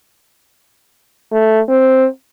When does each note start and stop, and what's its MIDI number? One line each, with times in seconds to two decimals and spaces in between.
1.32 1.60 57
1.69 2.06 60